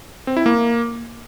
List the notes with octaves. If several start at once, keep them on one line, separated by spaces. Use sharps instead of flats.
C4
E4
A#3